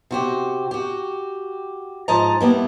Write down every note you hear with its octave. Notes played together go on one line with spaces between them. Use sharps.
C3 F#4 G4
F#4 G4
G#2 F3 D#5 A5 A#5
G3 A#3 B3 E4